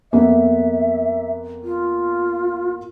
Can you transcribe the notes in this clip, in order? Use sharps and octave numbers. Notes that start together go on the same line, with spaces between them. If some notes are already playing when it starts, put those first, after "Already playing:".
F2 A#3 B3 E5
F4